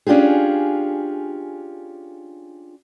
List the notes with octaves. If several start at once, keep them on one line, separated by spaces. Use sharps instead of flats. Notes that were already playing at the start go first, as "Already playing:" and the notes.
C#4 D4 F4 G4 G#4